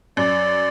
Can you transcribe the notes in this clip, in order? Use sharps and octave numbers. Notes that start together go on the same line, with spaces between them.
F#2 D5